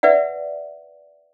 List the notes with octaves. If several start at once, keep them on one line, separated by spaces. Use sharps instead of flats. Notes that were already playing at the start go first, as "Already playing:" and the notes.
B4 D5 E5 F#5